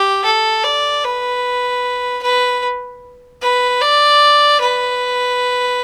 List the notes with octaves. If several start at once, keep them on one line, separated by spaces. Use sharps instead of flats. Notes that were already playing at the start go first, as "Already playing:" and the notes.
Already playing: G4
A4
D5
B4
B4
B4
D5
B4